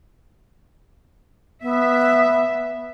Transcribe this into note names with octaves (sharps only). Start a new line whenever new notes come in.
B3 E5